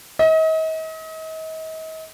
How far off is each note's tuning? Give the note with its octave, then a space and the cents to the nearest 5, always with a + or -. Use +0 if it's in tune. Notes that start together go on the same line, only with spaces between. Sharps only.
D#5 +40